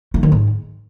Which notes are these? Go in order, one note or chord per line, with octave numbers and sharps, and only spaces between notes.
A3
D#3
G#2